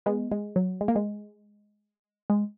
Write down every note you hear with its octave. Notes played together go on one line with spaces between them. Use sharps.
G#3 B3
G#3
F#3
G#3
A#3
G#3
G#3